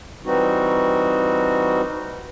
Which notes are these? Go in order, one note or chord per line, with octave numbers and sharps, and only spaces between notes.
E3 G3 C4 D#4 F#4